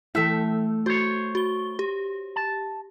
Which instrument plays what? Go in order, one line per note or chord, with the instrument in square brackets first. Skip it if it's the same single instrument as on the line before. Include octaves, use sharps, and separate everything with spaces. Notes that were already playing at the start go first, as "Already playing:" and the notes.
[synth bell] E3 E4 [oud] A3 A4 [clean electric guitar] E5
[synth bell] F#4 [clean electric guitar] C5 C#5
[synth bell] F#4 G7
G4
[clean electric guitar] A5